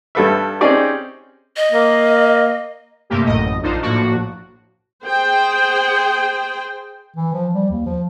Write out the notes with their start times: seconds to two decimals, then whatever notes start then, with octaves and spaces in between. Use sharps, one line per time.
0.15 G2 G3 A4 B4 E5
0.61 C4 C#4 D#4 G4 G#4 D5
1.56 D#5
1.72 A#3
3.10 G2 C3 A3 A#3 G4
3.26 A1 F#2 A2 D#5
3.62 A#1 D4 D#4 F4 C5
3.82 A2 F3 A#3 D4 F#4
5.04 G#4 C5 G5
7.16 E3
7.33 F3
7.54 G3
7.71 D#2
7.86 F3